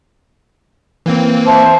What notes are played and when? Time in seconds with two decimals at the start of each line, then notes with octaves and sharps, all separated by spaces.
1.06 E3 A#3 C4
1.46 C5 E5 A5